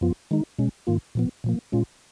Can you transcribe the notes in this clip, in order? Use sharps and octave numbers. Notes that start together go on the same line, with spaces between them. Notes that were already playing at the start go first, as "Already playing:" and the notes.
F#2 F3 B3 F4
D#3 G#3 D#4
B2 G#3 C#4
G#2 D#3 A#3 F4
A#2 F3 B3
A#2 F3 A#3
A#2 G#3 C#4 F4